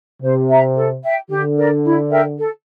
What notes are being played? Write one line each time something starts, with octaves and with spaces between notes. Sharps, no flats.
C3 C5
E5 A#5
A4
E5 G5
D3 G4
A#4 D5
E4
A#4 E5 G5
A4